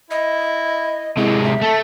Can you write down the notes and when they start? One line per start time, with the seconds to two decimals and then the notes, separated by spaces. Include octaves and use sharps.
0.11 E4 D#5
1.17 C3 G#3 E4
1.44 E5
1.62 A3 A4